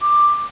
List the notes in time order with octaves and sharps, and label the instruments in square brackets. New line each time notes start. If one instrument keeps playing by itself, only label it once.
[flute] D6